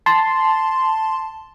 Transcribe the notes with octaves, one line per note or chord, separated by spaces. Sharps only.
A5 C6